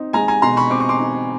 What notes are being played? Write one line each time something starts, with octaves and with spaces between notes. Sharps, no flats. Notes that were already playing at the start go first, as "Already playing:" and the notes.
Already playing: C4 D#4
G#3 G#5 A#5
G#5 A#5
B2 A#5 C6
B5 C#6
C4 D6
C#6
C6 D6
D#4